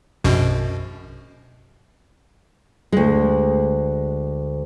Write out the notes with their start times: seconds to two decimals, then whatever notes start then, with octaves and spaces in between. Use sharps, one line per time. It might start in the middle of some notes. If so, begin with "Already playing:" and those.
0.24 A#1 F#2 B2
2.92 D2 G#3